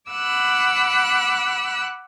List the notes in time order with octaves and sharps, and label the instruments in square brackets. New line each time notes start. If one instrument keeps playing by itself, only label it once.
[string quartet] F#5 B5 D6 E6 F#6